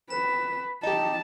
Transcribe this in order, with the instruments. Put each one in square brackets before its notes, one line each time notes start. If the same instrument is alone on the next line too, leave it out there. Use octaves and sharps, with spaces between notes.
[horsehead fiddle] B4 [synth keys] E7
[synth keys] D#4 G4 [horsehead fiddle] A5